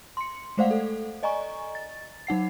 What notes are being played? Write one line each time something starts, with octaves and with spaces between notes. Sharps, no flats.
C6 C#7
G#3 A3 C5 D5 F5 F#5
A4
D5 D#5 G#5 A#5 C#6
A6
F#3 D#4 F#5 C7